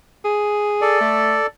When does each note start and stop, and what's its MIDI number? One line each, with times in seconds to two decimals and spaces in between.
0.25 1.00 68
0.81 1.47 69
0.81 1.47 74
1.01 1.36 57